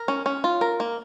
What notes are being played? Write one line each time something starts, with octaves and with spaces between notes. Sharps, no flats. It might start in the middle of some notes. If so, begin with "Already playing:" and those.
Already playing: A#4
C#4
C#4
F4
A#4
A#3